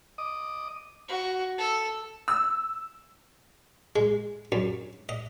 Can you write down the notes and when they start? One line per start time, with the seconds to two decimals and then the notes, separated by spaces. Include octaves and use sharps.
0.18 D#5 D6 D#6
1.08 F#4
1.58 A4
2.28 E6
3.96 G#3
4.52 F#2
5.09 D#5